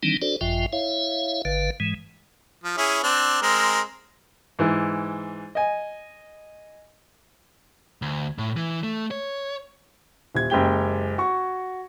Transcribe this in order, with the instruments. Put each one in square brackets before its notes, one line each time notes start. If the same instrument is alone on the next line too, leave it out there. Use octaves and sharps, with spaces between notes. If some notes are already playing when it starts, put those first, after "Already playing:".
[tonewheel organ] D#3 E3 G3 C4 D4 D#4
D4 F#4 A4 C5 D5
G#1 F#2 F3 F4 E5 G5
E4 C#5 E5 F5
G#1 D3 B4 F5
G#2 E3 G#3
[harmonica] F3
C#4 E4 G#4
C4 D4
G#3 C4 A#4
[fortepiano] G#2 E3
D#5 G#5
[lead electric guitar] D2
A2
E3
A3
C#5
[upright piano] D#1 G#6
F#1 G#3 G4 G5 G7
F#4 C#6